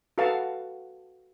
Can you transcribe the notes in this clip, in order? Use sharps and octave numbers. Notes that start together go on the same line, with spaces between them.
F#4 A4 B4 F5 F#5 A5